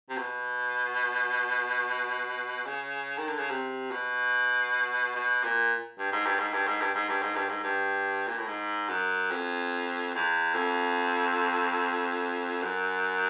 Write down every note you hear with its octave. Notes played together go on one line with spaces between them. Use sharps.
C3
B2
C#3
D#3
D3
C#3
C3
B2
B2
A#2
G2
G#2
G2
G#2
G2
G#2
G2
G#2
G2
G#2
G2
G#2
G2
A#2
A2
G#2
F#2
F2
E2
F2
F#2